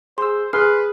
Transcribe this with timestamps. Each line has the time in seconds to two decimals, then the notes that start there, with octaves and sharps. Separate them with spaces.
0.18 G#4 C5 C6 E6
0.53 G#4 B4 C6 F6 F#6 C7